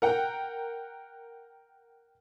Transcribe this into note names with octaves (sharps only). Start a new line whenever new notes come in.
A#4 F#5 G5